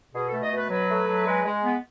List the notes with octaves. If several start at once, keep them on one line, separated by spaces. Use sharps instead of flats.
B2 G#4
A4
A3
D#5
B2
B4
F#3 B4
A3
F#3
G#3
G#3
B3